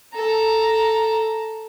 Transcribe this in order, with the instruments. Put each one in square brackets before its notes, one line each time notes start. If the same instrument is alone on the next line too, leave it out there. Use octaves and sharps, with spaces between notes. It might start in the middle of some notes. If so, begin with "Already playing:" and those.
[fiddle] A4 A#5